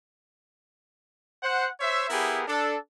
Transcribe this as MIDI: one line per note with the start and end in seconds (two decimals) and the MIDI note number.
1.43 1.68 72
1.43 1.68 78
1.80 2.06 72
1.80 2.06 73
1.80 2.06 76
2.10 2.42 59
2.10 2.42 64
2.10 2.42 67
2.10 2.42 68
2.10 2.42 70
2.48 2.76 62
2.48 2.76 69